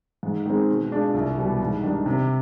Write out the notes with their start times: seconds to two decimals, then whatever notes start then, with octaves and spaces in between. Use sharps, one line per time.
0.23 G#2
0.46 D#3 G#3 C4
0.68 B2
0.91 G#3 D4 F4
1.14 C2
1.38 B2 G3
1.60 G#2
1.83 D#3 G3 D4
2.06 C3